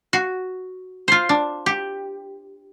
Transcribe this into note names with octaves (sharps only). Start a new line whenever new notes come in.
F#4
F4 C5
D4
G4